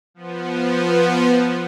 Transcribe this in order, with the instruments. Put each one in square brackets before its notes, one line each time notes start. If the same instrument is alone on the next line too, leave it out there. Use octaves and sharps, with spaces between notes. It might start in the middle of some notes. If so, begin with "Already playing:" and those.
[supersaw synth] F3 B3